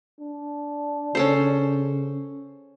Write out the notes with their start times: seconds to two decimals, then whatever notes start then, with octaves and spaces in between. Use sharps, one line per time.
0.20 D4
1.15 C#3 C#4 A4 C5